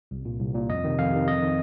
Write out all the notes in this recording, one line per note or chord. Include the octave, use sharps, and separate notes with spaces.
C2
A#2
C2
A#2
F2 D#5
C3 D#3
F2 F5
C3 D#3
F2 D#5
D#3